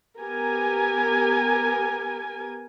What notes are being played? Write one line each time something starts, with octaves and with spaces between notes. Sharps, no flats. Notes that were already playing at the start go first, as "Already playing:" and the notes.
B3 G4 A#4 G#5